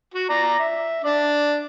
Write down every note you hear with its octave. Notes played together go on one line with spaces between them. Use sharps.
F#4
D5 A#5
E5
D4 D5